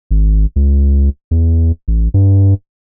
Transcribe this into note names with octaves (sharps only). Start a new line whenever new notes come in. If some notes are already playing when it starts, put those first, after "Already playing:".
G#1
C#2
E2
A1
G2